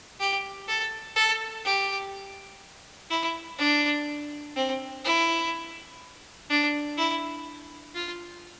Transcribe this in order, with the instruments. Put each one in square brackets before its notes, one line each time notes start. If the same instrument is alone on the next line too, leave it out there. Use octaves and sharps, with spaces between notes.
[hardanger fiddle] G4
A4
A4
G4
E4
D4
C4
E4
D4
E4
F4